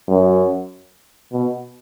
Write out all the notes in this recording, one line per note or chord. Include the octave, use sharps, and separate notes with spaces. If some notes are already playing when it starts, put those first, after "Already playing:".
F#2
B2